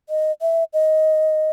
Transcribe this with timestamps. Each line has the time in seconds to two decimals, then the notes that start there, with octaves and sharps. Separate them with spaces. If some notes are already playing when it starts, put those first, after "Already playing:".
0.09 D#5
0.41 E5
0.73 D#5